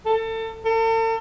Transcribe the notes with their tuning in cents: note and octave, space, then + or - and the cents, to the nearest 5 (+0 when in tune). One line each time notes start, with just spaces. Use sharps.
A4 +30
A4 +45